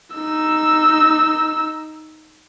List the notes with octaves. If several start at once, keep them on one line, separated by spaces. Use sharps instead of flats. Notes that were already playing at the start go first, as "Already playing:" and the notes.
D#4 E6